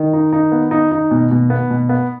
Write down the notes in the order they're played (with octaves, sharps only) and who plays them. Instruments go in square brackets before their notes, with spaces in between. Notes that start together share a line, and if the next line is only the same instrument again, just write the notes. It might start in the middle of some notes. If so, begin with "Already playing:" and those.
Already playing: [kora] D#3
[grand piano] D#4
D#4
B3
D#4
D#4
B2
B2
B3
B2
B3